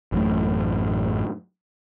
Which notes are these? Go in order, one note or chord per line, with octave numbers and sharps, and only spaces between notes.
A1 F#2 A2